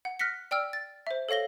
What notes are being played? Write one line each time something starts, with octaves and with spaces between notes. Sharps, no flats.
F#5
F6 F#6 A#6 B6 C#7
D5 G5 E6 F6
A6
C5 E5
A4 C#5 F5 A#6 G7